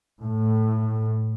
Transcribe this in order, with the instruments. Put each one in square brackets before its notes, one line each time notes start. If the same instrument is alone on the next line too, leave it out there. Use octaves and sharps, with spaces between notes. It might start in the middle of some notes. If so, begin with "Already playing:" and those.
[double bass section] A2